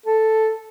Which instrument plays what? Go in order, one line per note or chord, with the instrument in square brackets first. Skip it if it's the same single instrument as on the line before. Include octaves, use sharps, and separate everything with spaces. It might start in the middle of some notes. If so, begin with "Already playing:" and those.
[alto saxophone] A4